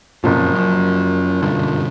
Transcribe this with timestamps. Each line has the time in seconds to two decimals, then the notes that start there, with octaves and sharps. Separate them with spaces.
0.24 F#1 F2 A#2 F3
0.54 F#2
1.42 E1 G2 D3